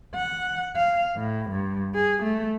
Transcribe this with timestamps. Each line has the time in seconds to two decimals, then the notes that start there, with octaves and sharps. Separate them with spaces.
0.15 F#5
0.76 F5
1.16 A2
1.50 G2
1.94 G#4
2.23 A3